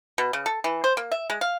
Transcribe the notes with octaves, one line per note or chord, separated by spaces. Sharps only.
B2
C#3
A4
E3
C5
A#3
E5
G#3
F5